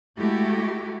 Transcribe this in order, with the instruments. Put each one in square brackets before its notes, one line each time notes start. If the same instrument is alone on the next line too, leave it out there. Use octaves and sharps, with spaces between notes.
[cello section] G#3 A3 E4 F#4 G4